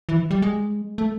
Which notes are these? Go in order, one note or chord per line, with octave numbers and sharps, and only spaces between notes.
E3
G3
G#3
A3